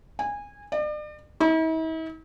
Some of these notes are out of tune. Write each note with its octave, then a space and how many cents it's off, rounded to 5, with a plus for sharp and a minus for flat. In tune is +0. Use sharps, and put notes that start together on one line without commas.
G#5 -20
D5 +40
E4 -45